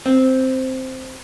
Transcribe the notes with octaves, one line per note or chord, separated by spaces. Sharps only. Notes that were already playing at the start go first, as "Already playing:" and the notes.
C4